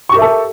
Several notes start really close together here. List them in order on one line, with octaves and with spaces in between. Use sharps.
C#6 G4 A#4 E5 A4